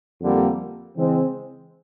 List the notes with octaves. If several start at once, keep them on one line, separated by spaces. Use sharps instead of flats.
F2 D3 G3 A#3
C#3 E3 G#3 C4